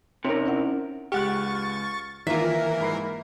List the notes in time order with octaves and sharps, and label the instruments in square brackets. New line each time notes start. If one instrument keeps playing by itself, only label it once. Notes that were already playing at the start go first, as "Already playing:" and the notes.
[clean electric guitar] C3 A#4 [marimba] C#4 D#4 C#5
[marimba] C#4 E4 F#5
[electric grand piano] C#2 G#3 F6 [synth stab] G4 F#5 F#6 [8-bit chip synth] C#6 A6
[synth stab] D#3 F4 [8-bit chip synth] E3 A#4 [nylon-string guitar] A#3 E5 [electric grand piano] B6
[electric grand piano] G#2 B5 C7